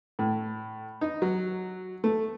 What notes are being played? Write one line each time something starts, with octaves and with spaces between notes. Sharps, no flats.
A2
D#4
F#3
A3